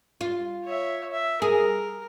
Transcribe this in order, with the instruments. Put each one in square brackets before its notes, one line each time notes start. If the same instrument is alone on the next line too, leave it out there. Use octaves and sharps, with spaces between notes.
[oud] F4
[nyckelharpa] C#5 E5
E5
[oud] G#4 [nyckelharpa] A#4